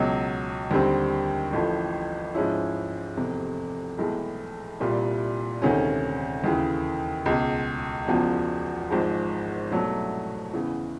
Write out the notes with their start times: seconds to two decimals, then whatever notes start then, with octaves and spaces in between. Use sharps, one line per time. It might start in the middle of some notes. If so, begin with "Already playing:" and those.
Already playing: C#2 B2 F#3
0.71 D#2 D3 G3 C4
1.53 A1 A2 F3
2.34 G#2 F3 G#3 C#4 E4
3.17 F1 E2 C3
3.98 B1 A2 E3 G#3
4.80 C2 A#2 G3
5.62 D2 C3 D#3 G#3 C#4
6.44 D#2 C#3 E3
7.26 C#2 B2 G#3
8.07 E1 E2 C#3 F3
8.90 G#1 G#2 F3 G#3
9.71 C2 B2 F#3 A3
10.53 E2 C#3 E3